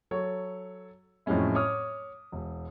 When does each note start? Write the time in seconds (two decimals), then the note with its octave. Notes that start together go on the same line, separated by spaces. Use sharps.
0.11 F#3 A4 C#5
1.26 F2 A2 F#3 G#3 C#4 E4
1.55 C#5 D6 D#6 F6
2.32 E1